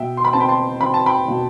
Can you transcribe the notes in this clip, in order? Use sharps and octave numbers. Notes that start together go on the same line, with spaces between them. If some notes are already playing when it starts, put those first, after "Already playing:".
Already playing: B2 E5 G5
C6
B5
C4 A5
G5 B5
A5 C6
C4 B5
A5
G5 B5
B2